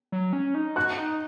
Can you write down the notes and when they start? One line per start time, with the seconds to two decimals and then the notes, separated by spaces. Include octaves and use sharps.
0.12 F#3
0.33 C#4
0.55 D#4
0.76 F#4 F#6
0.98 D#4